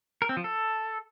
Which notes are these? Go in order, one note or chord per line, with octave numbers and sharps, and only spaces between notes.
A#4
C4
F3
A4